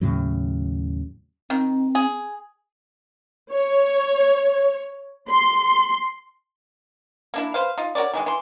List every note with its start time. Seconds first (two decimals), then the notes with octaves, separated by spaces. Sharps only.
0.01 D#2 A2 C#3 F#3
1.50 D#3 C4
1.95 G#4
3.51 C#5
5.29 C6
7.34 A#3 D4 E4
7.54 B4 C5 F5
7.78 D#4 F4
7.95 F#4 A#4 C#5 D5
8.14 D#3 E3 G#3
8.26 E3 C6